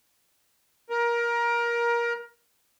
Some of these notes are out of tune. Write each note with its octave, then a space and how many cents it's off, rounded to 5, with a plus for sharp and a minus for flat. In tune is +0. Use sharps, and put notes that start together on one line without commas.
A#4 +20